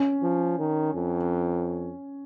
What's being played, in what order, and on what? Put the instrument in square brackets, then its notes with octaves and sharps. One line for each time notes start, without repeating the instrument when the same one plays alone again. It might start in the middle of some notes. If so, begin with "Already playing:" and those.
Already playing: [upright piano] C#4
[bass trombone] F3
D#3
F2